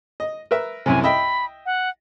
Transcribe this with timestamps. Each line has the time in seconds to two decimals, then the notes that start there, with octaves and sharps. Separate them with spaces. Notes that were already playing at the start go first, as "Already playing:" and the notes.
0.20 D#5
0.51 A#4 B4 E5
0.86 C2 F#2 C3 G#5
1.03 D#5 E5 G5 B5
1.66 F#5